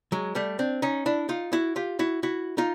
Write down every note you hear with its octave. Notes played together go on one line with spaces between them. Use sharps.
F#3 G#3
G3 A3
C4 D4
C#4 D#4
D4 E4
D#4 F4
E4 F#4
F4 G4
E4 F#4
E4 F#4
D#4 F4